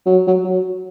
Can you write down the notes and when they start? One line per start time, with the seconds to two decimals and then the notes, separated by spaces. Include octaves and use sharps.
0.06 F#3
0.27 F#3
0.44 F#3